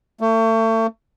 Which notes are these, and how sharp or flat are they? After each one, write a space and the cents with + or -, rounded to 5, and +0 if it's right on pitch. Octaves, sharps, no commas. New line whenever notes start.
A3 +35